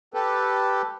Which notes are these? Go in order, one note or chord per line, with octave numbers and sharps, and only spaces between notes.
G4 A4 B4